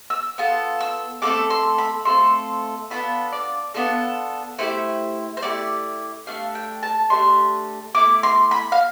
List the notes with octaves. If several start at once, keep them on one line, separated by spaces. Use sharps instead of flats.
E6
B3 F4 A4
E6
A3 C4 F4 A4 D6
C6
B5
A3 C4 F4 A4 C6
B3 D4 F4 A4 B5
D5
B3 D4 F4 A4
A3 E4 G4 C5
C5
A3 E4 G4 D5
A3 D4 G4 F5
G5
A5
A3 D4 G4 C6
A3 C4 E4 D6
C6
B5
F5